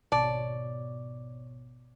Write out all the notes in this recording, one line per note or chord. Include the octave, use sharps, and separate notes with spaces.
G#1 B2 C#5 D5 A5